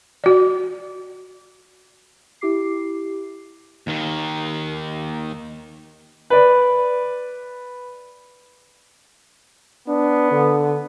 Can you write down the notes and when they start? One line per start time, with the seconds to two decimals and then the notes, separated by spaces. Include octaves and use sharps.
0.24 F#4 D5
2.41 E4 G4 D6 C7
3.87 D#2 D#3
6.30 B4 D5
9.88 B3 D4
10.32 D3